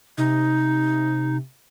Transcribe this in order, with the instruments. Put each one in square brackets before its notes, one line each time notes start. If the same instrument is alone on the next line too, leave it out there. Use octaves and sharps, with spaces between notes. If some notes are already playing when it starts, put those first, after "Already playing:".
[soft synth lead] C3 [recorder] D#4